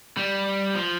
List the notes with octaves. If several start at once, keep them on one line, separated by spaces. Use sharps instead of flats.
G3
F3